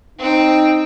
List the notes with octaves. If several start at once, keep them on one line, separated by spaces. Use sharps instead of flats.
C4 D#4 G5